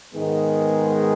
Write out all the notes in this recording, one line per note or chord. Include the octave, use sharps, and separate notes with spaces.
G#2 D#3 G#3 B3